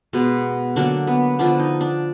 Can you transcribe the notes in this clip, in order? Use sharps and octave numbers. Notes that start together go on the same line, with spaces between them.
B2 G#3 B3
D3 F#3 A#3 D4
B3
D3 F3 B3 D4
D#4
D4